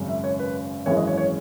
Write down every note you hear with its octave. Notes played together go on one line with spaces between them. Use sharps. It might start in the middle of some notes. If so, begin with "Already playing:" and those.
Already playing: G#1 F#2 C#3
E5
C#5
B4
G#1 F#2 E3 G#3 C#5
D#5
C#5
C#5